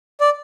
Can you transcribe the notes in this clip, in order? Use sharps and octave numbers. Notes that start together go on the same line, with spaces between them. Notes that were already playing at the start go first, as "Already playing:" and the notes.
D5